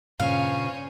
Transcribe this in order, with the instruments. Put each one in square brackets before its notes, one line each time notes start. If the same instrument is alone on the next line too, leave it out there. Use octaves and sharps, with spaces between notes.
[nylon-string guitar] G2 A#2 C#3 [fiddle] C#4 C5 [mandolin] F5